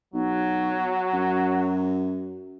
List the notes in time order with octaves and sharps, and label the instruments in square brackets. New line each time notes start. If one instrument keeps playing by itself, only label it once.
[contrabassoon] B1 [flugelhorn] F#3
[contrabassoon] F#2